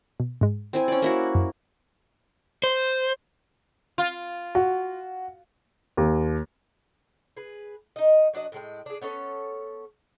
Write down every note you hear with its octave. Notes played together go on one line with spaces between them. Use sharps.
B2
G#2 G#3
C4 E4 G#5
C#4 D5
A#3 E4 F#4
F#2
C5
F4
F#4
D#2
G#4 B4
D#4 D#5
F#3 D4 F#4 D#5
A2 G#3 G5
D4 G#4
B3 C#4 A4 C#5